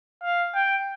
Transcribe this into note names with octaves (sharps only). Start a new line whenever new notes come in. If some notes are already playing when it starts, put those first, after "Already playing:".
F5
G5